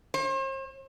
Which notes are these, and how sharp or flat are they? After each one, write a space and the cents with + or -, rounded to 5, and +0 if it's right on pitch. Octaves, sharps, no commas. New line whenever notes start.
C5 +45